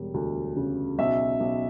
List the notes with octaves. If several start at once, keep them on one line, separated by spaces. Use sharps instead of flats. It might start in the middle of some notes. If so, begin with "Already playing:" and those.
Already playing: E1 G3
D2
C#3
B1 E5
B1